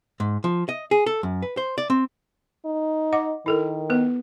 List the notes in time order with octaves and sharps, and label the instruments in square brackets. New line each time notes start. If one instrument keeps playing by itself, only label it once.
[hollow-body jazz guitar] G#2
F3
D#5
G#4
A4
F#2
B4
C5
D5
C4
[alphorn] D#4
[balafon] D#5 F#5 D6
[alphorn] D#3 [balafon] E4 A4 A#4
[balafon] B3 B4